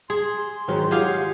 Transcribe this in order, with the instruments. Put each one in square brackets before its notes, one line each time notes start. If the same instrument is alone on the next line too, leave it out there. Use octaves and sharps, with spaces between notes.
[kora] G#4 [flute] C6
[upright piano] G#2 D#3 F#3
[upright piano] F4 [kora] G4 G#4 F5 [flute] F#5